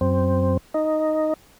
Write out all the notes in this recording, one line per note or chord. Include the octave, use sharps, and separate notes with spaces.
F#2 C4
D#4